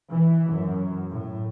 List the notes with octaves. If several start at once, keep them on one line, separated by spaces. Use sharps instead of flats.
E3
F#2
A2